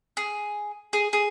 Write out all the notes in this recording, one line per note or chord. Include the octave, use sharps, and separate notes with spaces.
G#4
G#4
G#4